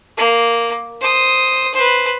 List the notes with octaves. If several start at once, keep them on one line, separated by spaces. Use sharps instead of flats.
A#3
C5 D#6
B4 C5